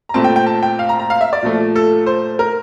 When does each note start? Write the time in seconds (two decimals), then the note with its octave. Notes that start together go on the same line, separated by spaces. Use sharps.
0.09 A#5
0.14 A#2 A3 C4 A5
0.24 G5
0.36 G5
0.46 A5
0.63 G5
0.79 F5
0.89 A#5
0.99 A#5
1.10 F5
1.21 E5
1.33 D5
1.43 A#2 F3 A3
1.76 A4
2.06 C5
2.39 A#4